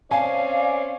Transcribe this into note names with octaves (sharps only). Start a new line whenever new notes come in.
C4 C#4 D5 F5 G#5